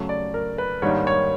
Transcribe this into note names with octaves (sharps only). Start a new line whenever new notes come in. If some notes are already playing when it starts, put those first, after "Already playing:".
Already playing: C#3 F#3 A3
D5
A#4
B4
G#2 D#3 G3 A#3 D4 C#5
C#5